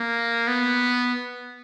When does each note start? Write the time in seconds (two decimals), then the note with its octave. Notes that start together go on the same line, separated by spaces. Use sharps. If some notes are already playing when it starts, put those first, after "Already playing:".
Already playing: A#3
0.48 B3